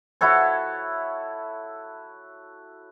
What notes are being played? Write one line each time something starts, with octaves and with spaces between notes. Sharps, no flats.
E4 F#4 A4 C#5